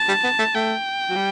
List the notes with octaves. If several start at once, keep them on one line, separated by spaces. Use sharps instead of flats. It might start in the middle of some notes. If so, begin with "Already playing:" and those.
Already playing: A5
G3
B3
A3
A3 G5
F#3
G3